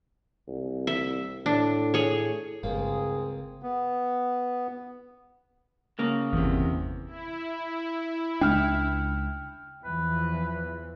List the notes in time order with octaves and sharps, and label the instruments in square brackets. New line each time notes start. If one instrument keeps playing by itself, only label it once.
[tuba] C2
[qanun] E5
[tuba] A2 [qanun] D4
[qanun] G#4 C#5
[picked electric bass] G1 [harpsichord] C#2 A#3 [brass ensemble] C4 G#4
[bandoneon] B3
[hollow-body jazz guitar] C#3 A#3
[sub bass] G1 [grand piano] E2 C3
[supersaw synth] E4
[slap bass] C#2 G#3 D4 [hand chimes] G5 F6
[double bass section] E2 E3 F3 [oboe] B4